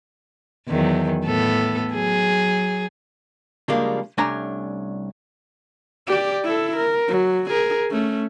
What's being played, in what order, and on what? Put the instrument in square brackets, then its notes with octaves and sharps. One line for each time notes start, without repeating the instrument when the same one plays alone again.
[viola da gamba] E2 D#3 F#3
A2 B3 A4
F#3 G#4
[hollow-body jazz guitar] C#3 F3 G3 G#3 A#3 D4
C2 A3 C#4 D4 G#5 A#5
[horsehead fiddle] G4 D5
E4 A4
A#4
F#3
G#4 A#4
A3 C#4